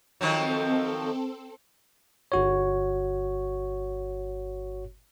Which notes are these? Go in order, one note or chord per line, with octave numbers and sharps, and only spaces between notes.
D#3 F3 F#3 C4 A4
G1 F#4 C#5